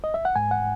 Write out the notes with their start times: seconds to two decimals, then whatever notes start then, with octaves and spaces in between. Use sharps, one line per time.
0.04 D#5
0.14 E5
0.25 F#5
0.36 G#2 G#5
0.51 F#5